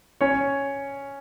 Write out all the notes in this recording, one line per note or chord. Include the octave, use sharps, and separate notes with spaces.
C#4 C#5